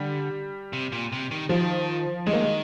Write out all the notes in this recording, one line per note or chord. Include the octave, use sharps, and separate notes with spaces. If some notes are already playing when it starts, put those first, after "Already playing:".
Already playing: D3 G3
C3
A#2
C3
D#3
D#3 F3
D#3 G#3
A#3
G#3